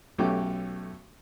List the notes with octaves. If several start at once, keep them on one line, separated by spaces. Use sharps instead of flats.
B1 A3 C#4 F#4 G4 D6